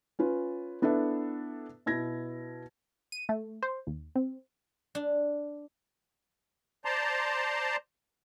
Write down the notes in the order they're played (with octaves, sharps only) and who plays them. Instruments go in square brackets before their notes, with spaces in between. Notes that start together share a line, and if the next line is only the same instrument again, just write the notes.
[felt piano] C#4 F4 B4
B3 D4 E4 A4 E5
B2 E4 G#6 A#6
[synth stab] D#7
A3
C5
D#2
C4
[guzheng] D4
[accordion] C5 D5 A5 A#5 C6